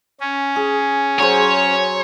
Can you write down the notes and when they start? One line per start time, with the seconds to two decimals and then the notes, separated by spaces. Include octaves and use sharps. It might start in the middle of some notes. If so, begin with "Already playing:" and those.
0.20 C#4
0.56 G#4
1.20 F#3 G#4 C5 C#5